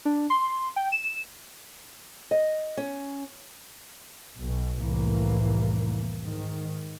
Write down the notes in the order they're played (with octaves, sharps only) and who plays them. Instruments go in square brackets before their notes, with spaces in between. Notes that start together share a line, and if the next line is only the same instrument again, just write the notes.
[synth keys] D4
C6
G5
E7
[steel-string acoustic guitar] D#5
C#4
[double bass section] B1 B2
F1 C2 A2 E3 A#3
G#2 D#3